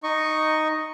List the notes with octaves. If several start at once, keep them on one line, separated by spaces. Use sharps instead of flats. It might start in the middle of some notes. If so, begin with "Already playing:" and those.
D#4 D#5 C#6